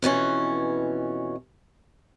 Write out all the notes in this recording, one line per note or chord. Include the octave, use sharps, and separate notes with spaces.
F2 B2 E3 C#4